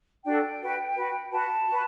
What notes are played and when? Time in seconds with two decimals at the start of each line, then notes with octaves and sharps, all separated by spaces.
0.25 D4 F#4 A4 G5
0.61 F#4 B4
0.96 F#4 B4
1.31 F#4 B4 A5
1.67 F#4 B4